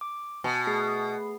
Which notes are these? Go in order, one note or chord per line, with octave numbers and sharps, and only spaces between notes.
D6
B2 G#5 A5
A3 G#4 C7